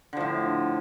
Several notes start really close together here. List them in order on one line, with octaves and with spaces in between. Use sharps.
D3 F3 A2